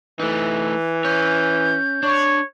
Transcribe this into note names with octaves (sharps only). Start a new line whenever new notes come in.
E3 A3 D#4
C#4 C#5 G6
D4 C#5